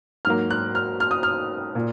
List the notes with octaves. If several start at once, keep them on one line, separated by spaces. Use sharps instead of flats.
G#2 F#3 A#3 F6
F#6
F6
F6
D#6
F6
A#2